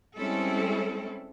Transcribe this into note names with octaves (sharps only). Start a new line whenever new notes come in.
G3 G#3 C4 C#4 E4 A4